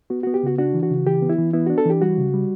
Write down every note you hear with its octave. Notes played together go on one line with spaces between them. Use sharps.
B3 F#4
B3 F#4
G4
C#3 F#4
D4 F#4
E3
F#4
C#3
E3 G4
B3
E4
E3
B3 E4
D4 F#4
A4
E3 G4
G3 F#4
C#3
G3